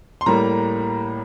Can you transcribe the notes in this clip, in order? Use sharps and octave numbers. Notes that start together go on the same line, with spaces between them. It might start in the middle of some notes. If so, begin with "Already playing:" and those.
C6
A2 G3 A#3 A#5